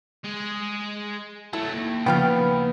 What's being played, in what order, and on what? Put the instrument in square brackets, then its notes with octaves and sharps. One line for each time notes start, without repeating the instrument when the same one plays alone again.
[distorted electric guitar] G#3 G#4
[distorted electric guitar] F#3 A3 [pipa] E4 A4
[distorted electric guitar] D#2
[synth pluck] C#3 F3 [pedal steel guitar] B3 B4 F6 [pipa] F4 F5 G5